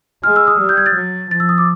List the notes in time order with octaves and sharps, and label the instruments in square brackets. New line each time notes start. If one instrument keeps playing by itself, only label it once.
[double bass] G#3 [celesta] F6
[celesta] E6
D#6
[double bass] G3
[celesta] G6
G#6
A6
[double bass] F#3
[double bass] F3 [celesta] A6
[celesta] E6
D#6
D6